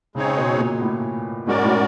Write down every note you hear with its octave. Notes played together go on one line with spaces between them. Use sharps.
C#3 G#3 C4 D#4 G#4 C#5
B2
A#2
A2
G#2 G#3 C#4 F#4 A#4 D5
A2